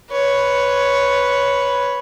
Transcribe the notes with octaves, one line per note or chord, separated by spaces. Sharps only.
B4 C#5